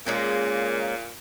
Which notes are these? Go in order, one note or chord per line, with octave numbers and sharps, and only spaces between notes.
A#2 G#3 A#3 C#4